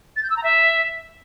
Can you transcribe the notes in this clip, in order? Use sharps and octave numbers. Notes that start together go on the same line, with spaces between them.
A6
G6
E6
A#5
E5